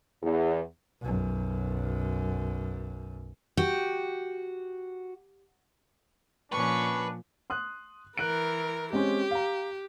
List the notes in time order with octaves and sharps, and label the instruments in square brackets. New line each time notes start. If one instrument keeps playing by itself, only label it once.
[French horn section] E2
[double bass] B1 F#2
[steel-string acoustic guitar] F#4 [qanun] G4 G5
[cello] A#2 F3 [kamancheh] C#4 C#6 [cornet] D4 [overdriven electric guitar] B4
[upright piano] C6 D#6 F#6
[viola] E3 A#4 [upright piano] F#6 D7
[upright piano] G#3 C4 C#4 [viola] G4
[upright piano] F5 A#5